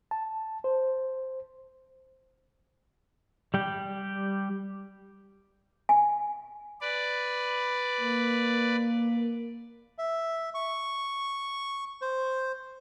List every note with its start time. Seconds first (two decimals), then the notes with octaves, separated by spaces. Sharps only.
0.11 A5
0.64 C5
3.54 G3 G4
5.89 G#5
6.81 B4 D5
8.01 A#3
9.98 E5
10.54 C#6
12.02 C5